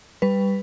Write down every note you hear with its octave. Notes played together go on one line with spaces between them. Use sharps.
G3 B4